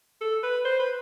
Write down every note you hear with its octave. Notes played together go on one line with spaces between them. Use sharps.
A4
B4
C5
B4